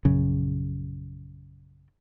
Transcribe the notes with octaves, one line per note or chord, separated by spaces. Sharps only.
A#1 F#2 C#3